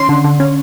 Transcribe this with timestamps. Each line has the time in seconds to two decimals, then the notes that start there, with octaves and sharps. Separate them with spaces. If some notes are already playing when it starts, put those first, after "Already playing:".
Already playing: D#3 C#4 C6
0.09 D3
0.24 D3
0.40 C#4